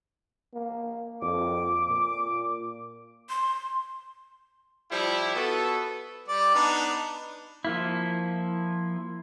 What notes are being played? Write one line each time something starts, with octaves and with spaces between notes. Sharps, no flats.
A#3
F2 D6
A#2
C6
F3 G3 E4 G4
B3 F#4 A4
G3 D5
B3 D4 D#4
F3 A#3 E4